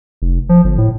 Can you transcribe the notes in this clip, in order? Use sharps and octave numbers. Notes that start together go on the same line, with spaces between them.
F1
F3
G1
A2